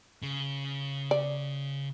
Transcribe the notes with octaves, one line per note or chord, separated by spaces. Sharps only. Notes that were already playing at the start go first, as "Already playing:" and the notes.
C#3
D5